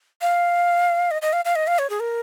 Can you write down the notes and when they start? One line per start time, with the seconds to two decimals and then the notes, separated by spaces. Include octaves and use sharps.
0.21 F5
1.11 D#5
1.22 D#5
1.33 F5
1.45 F5
1.56 D#5
1.67 F5
1.79 C#5
1.90 G#4
2.00 A#4